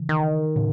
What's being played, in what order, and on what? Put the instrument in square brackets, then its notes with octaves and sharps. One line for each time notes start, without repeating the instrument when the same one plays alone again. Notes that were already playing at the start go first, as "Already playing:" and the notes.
Already playing: [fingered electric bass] C#3 E3
[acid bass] D#3
[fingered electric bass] A2 C#3